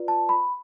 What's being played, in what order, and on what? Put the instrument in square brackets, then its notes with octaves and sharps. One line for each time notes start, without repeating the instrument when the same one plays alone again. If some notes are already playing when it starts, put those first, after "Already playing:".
Already playing: [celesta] F4 B4 D5
A5
B5